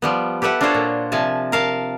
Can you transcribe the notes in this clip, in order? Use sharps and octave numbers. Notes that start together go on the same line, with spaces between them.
F3 G3 B3
G4 A4 B4 E5 F#5
D4 F4 F#4 A4 C5 C#5
A#2
C3 F3 G#5 A5
A#4 F5 A5